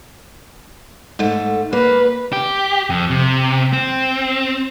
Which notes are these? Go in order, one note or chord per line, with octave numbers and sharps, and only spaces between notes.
G#2 A3
A#3 B4
G4
F2
C3
C4